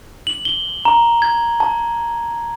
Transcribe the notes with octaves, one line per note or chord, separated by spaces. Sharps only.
F#7
G7
A#5
G#6
A5